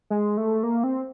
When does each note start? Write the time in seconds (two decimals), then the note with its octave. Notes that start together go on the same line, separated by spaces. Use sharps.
0.10 G#3
0.37 A3
0.63 A#3
0.84 C4